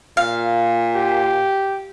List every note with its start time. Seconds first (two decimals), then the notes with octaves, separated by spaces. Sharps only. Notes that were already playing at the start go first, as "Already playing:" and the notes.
0.17 A#2 F5
0.95 G4